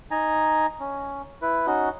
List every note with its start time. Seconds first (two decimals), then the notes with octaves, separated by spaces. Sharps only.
0.11 D#4 G#5 A#5
0.80 C#4
1.42 E4 B4
1.66 C#4 D#4 F#4